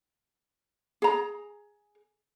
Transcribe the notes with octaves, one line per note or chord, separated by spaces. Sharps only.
G#4 A#5